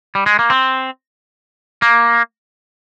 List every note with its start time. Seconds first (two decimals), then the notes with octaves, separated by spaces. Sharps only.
0.15 G3
0.26 G#3
0.39 A#3
0.50 C4
1.82 A#3